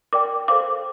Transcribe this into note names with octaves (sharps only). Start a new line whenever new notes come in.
A#4 D5 G5 D6
A4 C5 F5 D6